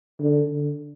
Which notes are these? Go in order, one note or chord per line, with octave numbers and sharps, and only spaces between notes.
D3
D3